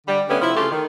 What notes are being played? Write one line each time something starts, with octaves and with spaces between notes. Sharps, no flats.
D3 G3
D3 G3 A3 B3 C#4
C3 F3 E4
C#3 A3 F4 G4 A4
D#3